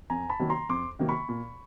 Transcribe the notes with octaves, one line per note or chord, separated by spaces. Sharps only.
F2 G#5 A#5
A5 B5
C3 D#3 F#3 A#3
A#5 C6
F2 C6 D6
C3 D#3 F#3 A#3
B5 C#6
A#2